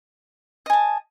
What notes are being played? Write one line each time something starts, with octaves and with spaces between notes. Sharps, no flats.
D#5 G#5 A5